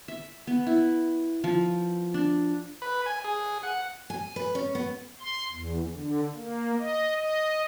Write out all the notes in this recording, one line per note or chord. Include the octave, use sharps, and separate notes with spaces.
E5
B3
E4
F3
D4
B4
G#5
G#4
F#5
G#5
B4
C#4
B3
C6
E2
D3
A#3
D#5
D#5